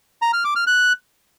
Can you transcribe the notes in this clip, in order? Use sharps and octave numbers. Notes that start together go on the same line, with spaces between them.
A#5
F6
D6
F6
F#6